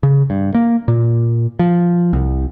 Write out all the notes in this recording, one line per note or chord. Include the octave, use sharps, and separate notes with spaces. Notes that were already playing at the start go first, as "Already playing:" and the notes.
C#3
G2
A#3
A#2
F3
C2